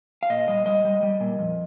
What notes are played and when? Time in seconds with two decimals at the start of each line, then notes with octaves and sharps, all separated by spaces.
0.23 F5
0.30 A#2 D#5
0.48 G3 D#5
0.66 G3 D#5
0.85 G3
1.03 G3
1.20 A#2
1.39 F2